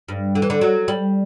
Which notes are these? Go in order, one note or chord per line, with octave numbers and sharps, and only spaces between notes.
G2
D3
E3
D3
F#3
G3